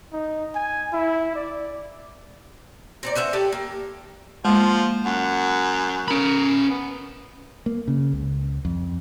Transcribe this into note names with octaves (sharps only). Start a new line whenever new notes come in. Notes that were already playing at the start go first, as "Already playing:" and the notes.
D#4
G#5
E4
D5
C4 D#4 D5
C#4 C5 E5 F#5
G4 A4 D5 G5
A#3
F3 G#3 A#3 F4
F#2 F#5
C#4 A#4 B5
B3
A#3
C#3
C#2
F2